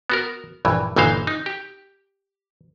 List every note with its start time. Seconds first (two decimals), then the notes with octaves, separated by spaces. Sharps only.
0.10 B3 F#4 A#4
0.65 A#1 G2 E3
0.96 G1 A#2 E3 D#4 C5 F5
1.27 D#4
1.46 G4